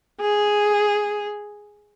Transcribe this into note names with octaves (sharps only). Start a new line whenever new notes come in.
G#4